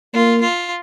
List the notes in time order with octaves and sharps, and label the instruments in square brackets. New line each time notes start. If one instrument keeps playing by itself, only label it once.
[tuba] A#3 [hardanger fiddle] F4
[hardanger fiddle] F4